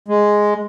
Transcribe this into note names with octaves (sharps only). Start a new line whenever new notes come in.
G#3